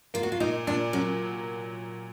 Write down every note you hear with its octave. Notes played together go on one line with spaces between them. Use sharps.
A#3 F4
F#4
F4
A#2 D#4
A#2 D4
F#3 C#4